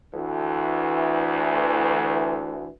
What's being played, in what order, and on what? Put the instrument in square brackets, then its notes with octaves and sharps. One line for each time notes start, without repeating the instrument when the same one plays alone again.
[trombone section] D2 E3